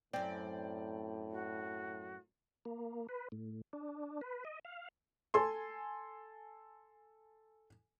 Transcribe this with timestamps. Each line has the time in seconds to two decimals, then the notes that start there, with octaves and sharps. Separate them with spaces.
0.13 F#2 A2 C4 D5 G5
1.31 F#4
2.65 A#3
3.09 B4
3.32 A2
3.73 D4
4.21 B4
4.45 D#5
4.65 F5
5.34 A4 G#5 C6